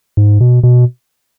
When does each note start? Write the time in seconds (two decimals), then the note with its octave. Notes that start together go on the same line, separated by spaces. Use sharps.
0.17 G#2
0.40 B2
0.63 B2